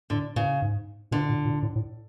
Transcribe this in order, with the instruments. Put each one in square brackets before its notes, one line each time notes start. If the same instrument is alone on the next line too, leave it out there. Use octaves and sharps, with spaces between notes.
[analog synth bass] A2 [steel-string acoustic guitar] D3
[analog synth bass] A2 [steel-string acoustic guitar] C#3
[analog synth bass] G#2
[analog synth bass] A#2 [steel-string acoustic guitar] D3
[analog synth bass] A#2
A#2
A2
A2